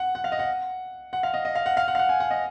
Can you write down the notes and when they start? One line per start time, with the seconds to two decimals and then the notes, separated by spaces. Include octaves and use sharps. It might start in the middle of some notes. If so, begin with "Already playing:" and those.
Already playing: F#5
0.15 F#5
0.24 F5
0.32 D#5
0.39 F#5
1.13 F#5
1.23 F5
1.34 D#5
1.45 D#5
1.55 F5
1.66 F#5
1.77 F5
1.88 F#5
1.95 F5
1.99 F#5
2.09 G#5
2.20 F#5
2.30 D#5